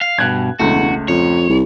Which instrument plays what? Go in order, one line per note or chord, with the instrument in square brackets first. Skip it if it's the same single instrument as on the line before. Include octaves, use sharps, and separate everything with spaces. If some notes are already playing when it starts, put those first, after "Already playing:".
[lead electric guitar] F5
[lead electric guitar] G2 B2 [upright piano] F#6 G#6
[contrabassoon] E1 [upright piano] C#2 A3 [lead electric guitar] F#4
[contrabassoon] F2 [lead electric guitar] C#5
[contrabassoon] C2